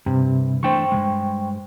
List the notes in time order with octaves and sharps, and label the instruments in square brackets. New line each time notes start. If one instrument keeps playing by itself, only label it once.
[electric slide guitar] G2 [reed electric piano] C3
[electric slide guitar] E3 A3 D4 [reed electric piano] C5 G5 C#6
[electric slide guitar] G2 C#3 G#3